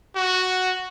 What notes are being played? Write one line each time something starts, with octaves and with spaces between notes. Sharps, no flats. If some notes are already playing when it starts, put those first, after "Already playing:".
F#4